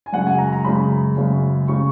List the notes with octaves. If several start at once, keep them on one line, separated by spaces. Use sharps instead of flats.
G#5
F#2 C#3 G#3 F#5
G#5
A#5
A#5
F#2 C#3 G#3 B5
F#2 C#3 G#3
C#3 G#3 C#6